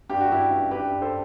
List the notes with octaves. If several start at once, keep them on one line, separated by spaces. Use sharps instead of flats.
G2 G4
F#4
G2 E4 G4
G2
G2 G4 B4
G2
A4 C5